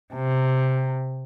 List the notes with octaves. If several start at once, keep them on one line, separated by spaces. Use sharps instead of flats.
C3